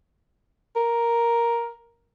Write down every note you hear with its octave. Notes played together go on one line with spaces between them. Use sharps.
A#4